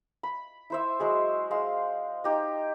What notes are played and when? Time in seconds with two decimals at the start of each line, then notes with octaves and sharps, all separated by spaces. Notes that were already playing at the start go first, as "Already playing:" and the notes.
0.23 B5
0.70 E4 C5 E5
1.00 F#3 G#3 G#4
1.51 G#3 F5 C6
2.24 D#4 G4 D#5